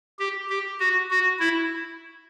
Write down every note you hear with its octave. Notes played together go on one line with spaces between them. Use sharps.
G4
G4
F#4
F#4
E4